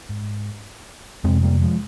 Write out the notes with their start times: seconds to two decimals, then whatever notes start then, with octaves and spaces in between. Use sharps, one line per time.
0.09 G#2
1.24 F2 C3 G#3 C4
1.43 G3 A#3
1.62 F3 G#3